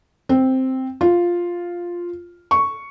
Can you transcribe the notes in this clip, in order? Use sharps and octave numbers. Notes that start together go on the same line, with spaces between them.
C4
F4
C#6